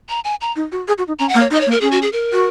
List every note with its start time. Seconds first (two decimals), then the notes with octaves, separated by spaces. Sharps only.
0.09 A#5
0.24 G#5
0.41 A#5
0.56 D#4
0.72 F#4
0.88 G#4
0.98 F#4
1.08 D#4
1.19 C#4 A#5
1.29 F#5
1.34 A#3
1.40 C#5
1.51 D#4
1.54 D#5
1.61 C#5
1.66 A#3
1.71 A#4
1.81 C#4 G#4
1.91 F#4
2.02 G#4
2.13 A#4
2.33 F#4